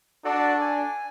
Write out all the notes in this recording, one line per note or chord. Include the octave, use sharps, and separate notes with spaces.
D4 F#4 A4 D5
G#5